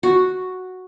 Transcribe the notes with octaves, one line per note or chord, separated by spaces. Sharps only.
F#4